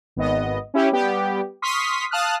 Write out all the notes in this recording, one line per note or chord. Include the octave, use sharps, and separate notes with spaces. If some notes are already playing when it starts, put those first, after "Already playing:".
G#1 B3 D#5
C#4 E4 G4
G3 B3 G4
C6 C#6 D#6 F6 B6
F5 A5 D#6 F6 F#6